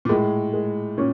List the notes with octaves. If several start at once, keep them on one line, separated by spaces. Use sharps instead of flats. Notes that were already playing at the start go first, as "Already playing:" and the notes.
A#2
A2 G#3
G#3
A#2 C#4